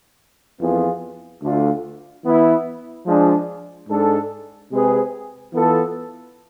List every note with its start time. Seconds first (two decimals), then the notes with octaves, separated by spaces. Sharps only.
0.60 F2 E3 B3 F4 G#4
1.42 D2 D3 A3 D4 F4
2.25 E3 B3 E4
3.06 F3 G#3 D4
3.89 G#2 G#3 D4 A4
4.72 C3 G#3 C4 G#4 B4
5.54 E3 B3 F4 A4